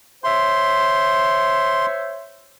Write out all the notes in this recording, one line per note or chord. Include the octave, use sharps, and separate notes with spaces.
C5 C#5 E5 C6